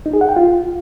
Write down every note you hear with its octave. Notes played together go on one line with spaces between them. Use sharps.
D#4
G#4
F#5
G5
F4